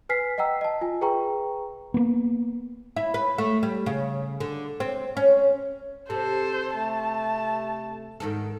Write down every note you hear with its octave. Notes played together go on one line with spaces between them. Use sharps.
B4 G#5 F6 B6 C7
D#5 F#5 G5 A#5 E6
D#5 A5
F4 G#5
G#4 B4 G5 A#5 C#6
A#3 B3
E4
B4
A3
G3
C#3
D3
C4
C#4
C3 A4 C5
A3 A5
G#2 D#3 A4